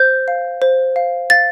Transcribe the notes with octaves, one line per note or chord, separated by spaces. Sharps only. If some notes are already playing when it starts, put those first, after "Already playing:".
Already playing: C5 G6
F5
C5
F5
F5 A6